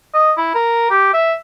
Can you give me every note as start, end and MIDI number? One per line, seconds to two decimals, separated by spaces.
0.14 0.32 75
0.37 0.52 64
0.55 0.88 70
0.90 1.10 67
1.14 1.34 76